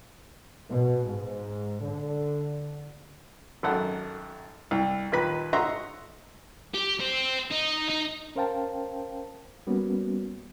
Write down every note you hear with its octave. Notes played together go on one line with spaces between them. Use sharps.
B2
G#2
D3
G#1 F#2 A4 F#5
C2
D#2 A#2 B4 B5 F#6
D#5 E5 F#5 A#5 C6 C#6
G4
C4
D#4
D#4
C#4 A#4 C5 F5 G5 A5
G3 A#3 B3 C#4 F#4